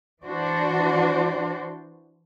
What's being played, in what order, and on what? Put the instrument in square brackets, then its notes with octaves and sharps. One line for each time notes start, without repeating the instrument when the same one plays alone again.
[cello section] E3 D4 F#4 C5 D5